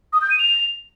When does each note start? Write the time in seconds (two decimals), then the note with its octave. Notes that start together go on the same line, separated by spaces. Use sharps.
0.13 D#6
0.22 G6
0.30 D#7
0.39 F7